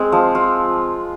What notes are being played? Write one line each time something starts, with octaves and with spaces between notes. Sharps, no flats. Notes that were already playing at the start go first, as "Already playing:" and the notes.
Already playing: G#3 C4
F3
F4